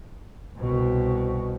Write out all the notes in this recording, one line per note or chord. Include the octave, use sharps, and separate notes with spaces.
C2 B2